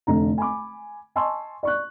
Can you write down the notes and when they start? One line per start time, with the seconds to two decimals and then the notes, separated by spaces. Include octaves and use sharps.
0.07 F1 D3 A#5
0.38 G#5 B5 D6
1.15 D#5 G#5 A5 C6 C#6 E6
1.63 D5 C#6 F#6